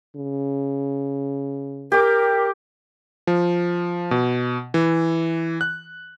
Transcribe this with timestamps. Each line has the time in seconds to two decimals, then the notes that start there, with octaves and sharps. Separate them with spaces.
0.16 C#3
1.92 G4 A#4 D6
3.27 F3
4.11 B2
4.74 E3
5.61 F#6